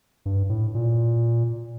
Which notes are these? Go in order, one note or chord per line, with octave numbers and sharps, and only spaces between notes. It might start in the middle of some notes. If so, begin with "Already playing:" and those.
G2
A2
A#2